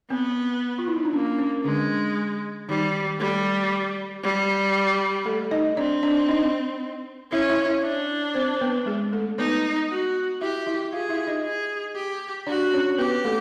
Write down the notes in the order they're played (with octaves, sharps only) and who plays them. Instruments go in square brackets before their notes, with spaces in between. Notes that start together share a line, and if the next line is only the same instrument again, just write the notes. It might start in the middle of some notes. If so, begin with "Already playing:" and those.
[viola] B3 [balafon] C4
[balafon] F4
E4
D#4
D4
[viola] A#3 [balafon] C#4
[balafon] C#4
[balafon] D3 D4 [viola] G#3
[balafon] D#3 D#4 [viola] G3
[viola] G3 [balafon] A3 A4
[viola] G3
[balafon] A3 A4
D#4 D#5
[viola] C4 [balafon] D4 D5
[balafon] D4 D5
D#4 D#5
[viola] C#4 [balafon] E4 E5
[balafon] E4 E5
E4 E5
[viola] D4
[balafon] C4 C5
B3 B4
G#3 G#4
A3 A4
[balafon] B3 B4 [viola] D#4
[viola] F#4
[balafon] E4 E5 [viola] G4
[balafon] E4 E5
[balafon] F4 F5 [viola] G#4
[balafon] E4 E5
D#4 D#5
[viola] G#4
G4
[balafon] D4 D5 [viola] F#4
[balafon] C#4 C#5
[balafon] B3 B4 [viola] G4
[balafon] A3 A4